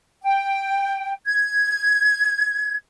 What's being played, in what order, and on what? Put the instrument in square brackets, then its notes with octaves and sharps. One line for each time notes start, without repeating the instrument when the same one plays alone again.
[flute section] G5
G#6